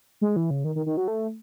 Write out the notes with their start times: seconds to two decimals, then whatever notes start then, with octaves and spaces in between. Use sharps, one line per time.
0.21 G#3
0.36 E3
0.51 C#3
0.64 D#3
0.76 D#3
0.86 D#3
0.97 F#3
1.08 A3